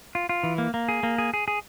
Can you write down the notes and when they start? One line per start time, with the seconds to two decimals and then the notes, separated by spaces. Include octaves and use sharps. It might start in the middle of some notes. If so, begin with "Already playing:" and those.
0.15 F4
0.29 F4
0.43 E3
0.58 A#3
0.74 A#3
0.89 G#4
1.03 A#3
1.18 G#4
1.34 G#4
1.48 G#4